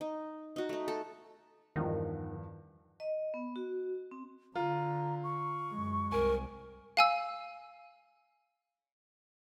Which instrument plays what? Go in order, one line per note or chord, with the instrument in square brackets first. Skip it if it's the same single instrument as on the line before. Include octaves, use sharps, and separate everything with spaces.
[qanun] D#4
D#4 F#4
A3 D#4
A4
[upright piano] E2 G2 F3 [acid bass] D#3
[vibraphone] D#5
B3
F#4
C4
[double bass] D3 [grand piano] F4 [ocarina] A#5
[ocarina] C#6
[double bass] F#2 G#3
[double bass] C2 [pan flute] A#4 [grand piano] G#5
[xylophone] F5 G#5 E6